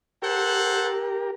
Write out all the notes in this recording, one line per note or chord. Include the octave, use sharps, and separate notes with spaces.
G4 A4 A#4 C5 F#5